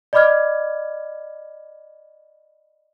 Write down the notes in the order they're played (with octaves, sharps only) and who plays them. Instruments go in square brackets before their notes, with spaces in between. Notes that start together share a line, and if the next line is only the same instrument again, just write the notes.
[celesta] D5 D#5 B5 D6 F6 G#6